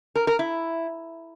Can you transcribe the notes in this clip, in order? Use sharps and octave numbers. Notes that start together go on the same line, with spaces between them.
A#4
A#4
E4